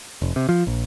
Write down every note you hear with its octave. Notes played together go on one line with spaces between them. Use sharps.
F1
C3
F3
A#1